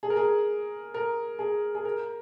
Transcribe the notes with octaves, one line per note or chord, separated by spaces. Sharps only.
G#4
A#4
G#4
A#4
G#4
G#4
A#4